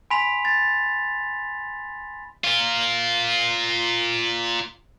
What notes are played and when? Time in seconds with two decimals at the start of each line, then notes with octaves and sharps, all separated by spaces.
0.10 G#5 B5 C6 B6 F7
0.45 A6
2.44 F4 A#4